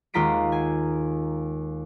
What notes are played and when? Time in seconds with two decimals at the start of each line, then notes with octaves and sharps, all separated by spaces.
0.14 D#2 G#3 F4 A#5 B6 D7
0.52 G#5